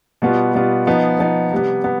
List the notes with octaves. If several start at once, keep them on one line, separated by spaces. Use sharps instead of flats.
B2 G3 B3 F4
B2 G3 B3 F4
F3 B3 D#4
F3 B3 D#4
C3 G3 B3
B3